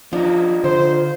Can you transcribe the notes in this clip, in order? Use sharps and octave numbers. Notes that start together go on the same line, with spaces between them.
F3 D4 F4 D#5
D3 C5